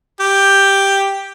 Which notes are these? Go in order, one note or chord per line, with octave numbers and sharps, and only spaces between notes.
G4